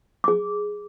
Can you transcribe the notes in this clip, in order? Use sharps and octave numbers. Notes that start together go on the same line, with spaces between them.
G#4 D6